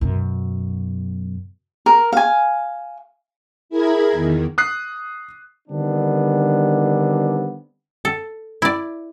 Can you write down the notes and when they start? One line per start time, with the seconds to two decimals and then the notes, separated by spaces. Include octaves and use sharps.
0.01 F#2 B2
1.86 A#4
2.13 F5 G#5
3.69 E4 G#4 A#4 B5 G#6
4.12 E2 D#3
4.58 D#6 F#6 C7
5.68 D3 D#3 G3 B3 C4 D4
8.05 A4
8.62 E4 D5